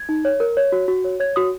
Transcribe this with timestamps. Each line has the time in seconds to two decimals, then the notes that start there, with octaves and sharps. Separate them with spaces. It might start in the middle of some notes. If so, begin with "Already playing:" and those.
Already playing: G#6
0.09 D#4
0.25 C#5
0.40 A#4
0.57 C#5
0.72 F#4
0.88 F#4
1.04 C#5
1.20 C#5 G#6
1.36 F#4 D#6